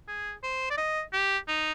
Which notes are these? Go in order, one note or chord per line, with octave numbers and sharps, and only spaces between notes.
G#4
C5
D5
D#5
G4
D#4